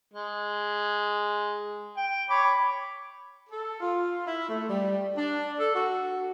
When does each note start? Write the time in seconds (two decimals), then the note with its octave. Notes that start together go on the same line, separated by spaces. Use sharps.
0.14 G#3
1.97 G5
2.30 C#5 B5 D6
3.50 A4
3.80 F4
4.25 E4
4.49 A3
4.68 G3
5.17 D4
5.59 A4
5.74 F#4